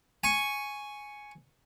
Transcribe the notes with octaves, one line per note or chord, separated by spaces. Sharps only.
G#5 C#6